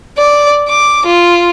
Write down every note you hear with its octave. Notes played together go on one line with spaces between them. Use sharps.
D5
D6
F4